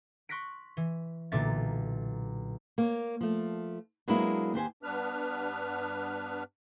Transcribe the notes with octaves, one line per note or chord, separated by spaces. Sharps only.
C6 C#6 F#6 A#6 B6 D7
E3
B1 A#2 D3 A#3 E5 A6
A#3 C#5
F3 A3
F#3 G#3 A#3 B3 D4 E4
D#2 G4 C5 G#5
G2 B3 D4 B4 F6